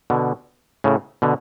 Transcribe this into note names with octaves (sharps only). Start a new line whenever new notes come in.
B2 D3
A2 C#3
B2 D3